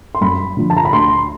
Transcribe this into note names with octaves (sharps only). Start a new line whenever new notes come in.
C6
F#2 B5
D3 F3
A5
A#5
B5
D2 C6